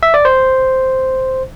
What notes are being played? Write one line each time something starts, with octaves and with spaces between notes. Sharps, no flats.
E5
D5
C5